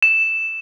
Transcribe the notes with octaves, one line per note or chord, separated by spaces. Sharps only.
E7